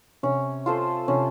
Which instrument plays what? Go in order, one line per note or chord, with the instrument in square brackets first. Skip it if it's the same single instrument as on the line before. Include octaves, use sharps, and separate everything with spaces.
[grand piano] C3 [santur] C#4
[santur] F4 A4 C5
[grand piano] C3 [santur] C#4